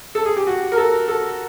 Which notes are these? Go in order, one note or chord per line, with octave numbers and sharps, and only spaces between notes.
A4
G#4
G4
F#4
A#4
A4
A4